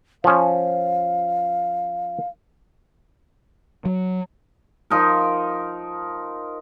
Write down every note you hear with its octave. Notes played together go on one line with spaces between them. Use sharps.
F3 C#4 F5
F#3
F3 D#4 A#4